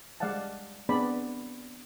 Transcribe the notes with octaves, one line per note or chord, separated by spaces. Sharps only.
G3 G#3 D5 F5 F#5 A5
B3 C4 D4 G#4 D5 B5